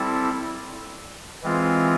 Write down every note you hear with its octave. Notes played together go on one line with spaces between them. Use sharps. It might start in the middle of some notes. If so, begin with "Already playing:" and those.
Already playing: G3 C4 E4 A4
E3 G#3 C4 F4